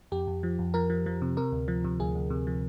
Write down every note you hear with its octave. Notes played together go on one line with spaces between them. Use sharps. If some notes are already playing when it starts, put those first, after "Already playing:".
F2 G4
F2
F3
F2
F3 A#4
F3
F3
C3
C3 A#4
D2
F3
C3
D2 G#4
D2
C3
F3